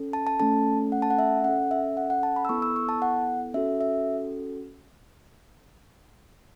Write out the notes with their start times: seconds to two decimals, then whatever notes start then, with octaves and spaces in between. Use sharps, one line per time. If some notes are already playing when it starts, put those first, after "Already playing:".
Already playing: C#4 A4
0.13 A5
0.27 A5
0.40 A3 C#4 A4 A5
0.92 F#5
1.02 A5
1.10 F#5
1.19 E5
1.44 C#4 A4 F#5
1.71 E5
1.97 F#5
2.10 F#5
2.23 A5
2.36 B5
2.45 E6
2.49 B3 E4 A4 C#6
2.62 E6
2.76 C#6
2.89 A5
3.02 F#5
3.54 C#4 F#4 A4 E5
3.81 E5